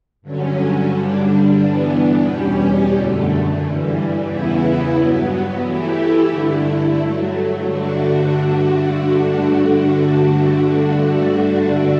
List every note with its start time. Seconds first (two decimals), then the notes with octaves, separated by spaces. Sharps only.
0.22 G2 D3 F#3 C#4
0.89 G2 D3 G3 D4
1.57 G2 E3 B3 D4
2.24 E2 B2 G3 C#4 G4
2.92 F#2 D3 A3
3.59 G2 E3 G3
4.27 E2 C#3 E3 B3 E4
4.94 G2 F#3 B3
5.62 E3 A3 E4 G4
6.29 G2 D3 A3 E4
6.97 G2 F#3 A3
7.64 G2 D3 A3 D4 F#4